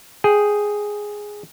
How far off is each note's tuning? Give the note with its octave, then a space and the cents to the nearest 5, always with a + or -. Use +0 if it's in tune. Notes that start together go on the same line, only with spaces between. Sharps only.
G#4 +0 G5 +0